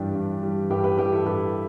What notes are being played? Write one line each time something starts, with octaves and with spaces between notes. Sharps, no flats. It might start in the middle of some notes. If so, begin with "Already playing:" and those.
Already playing: G2 E3 G3 D4 G4
G2
E3 G3
G2 G4 B4
G4 B4
E3 G3 G4 B4
E4 A4
G2 G4 B4